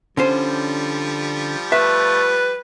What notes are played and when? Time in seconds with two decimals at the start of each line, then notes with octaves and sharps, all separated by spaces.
0.17 D3 F3 G3 C#4 C5
1.72 A3 B4 E5